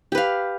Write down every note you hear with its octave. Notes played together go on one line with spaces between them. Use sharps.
G4 B4 F5